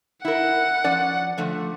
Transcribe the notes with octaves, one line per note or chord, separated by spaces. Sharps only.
E4 A#4 F#5
F3 C#4 D5
D3 F3 A3